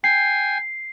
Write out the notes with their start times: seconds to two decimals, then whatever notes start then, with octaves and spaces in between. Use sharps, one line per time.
0.04 G5 G#5 C7